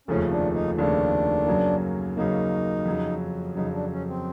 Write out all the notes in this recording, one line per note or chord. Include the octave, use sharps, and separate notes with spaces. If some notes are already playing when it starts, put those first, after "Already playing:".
F1 D#2 C#3 F3 A3 C#4
D4
D#4
F1 D#2 C#3 F3 A3 D4
F#2 C#3 F#3 A#3
F#2 C#3 F#3 A#3 D#4
F2 C#3 F#3
F2 C#3 F#3 D#4
D4
C#4
C4